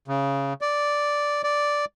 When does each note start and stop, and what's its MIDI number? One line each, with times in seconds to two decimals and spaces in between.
0.08 0.53 49
0.61 1.42 74
1.44 1.85 74